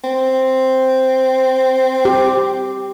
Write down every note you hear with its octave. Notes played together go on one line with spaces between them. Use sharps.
C4
G4